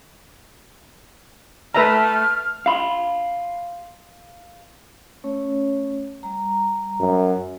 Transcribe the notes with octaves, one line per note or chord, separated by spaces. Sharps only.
A3 B4 E5 A#5 F6
F5 B5 C6
A3 C#4 C#5
G3 A#5
F#2